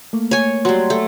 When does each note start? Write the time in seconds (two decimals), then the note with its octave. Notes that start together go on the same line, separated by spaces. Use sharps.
0.13 A3 A#3
0.31 C#5 G#5
0.65 F#3 G3 C6
0.90 A3